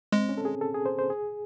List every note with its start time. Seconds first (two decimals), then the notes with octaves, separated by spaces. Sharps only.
0.12 G#3 C4
0.29 C#4
0.38 A4
0.45 G#4
0.61 A4
0.74 G#4
0.86 C5
0.99 C5
1.10 G#4